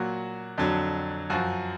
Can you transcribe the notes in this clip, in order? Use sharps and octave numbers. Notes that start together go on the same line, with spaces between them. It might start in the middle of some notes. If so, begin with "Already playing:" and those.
Already playing: A#2 F#3 F#4
F2 D3 F#3
F#2 F3 F#4